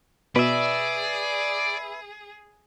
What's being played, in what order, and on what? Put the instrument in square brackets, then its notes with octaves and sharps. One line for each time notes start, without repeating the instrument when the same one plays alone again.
[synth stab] B2 [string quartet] G#4 [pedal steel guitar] B4 E5 [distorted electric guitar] D5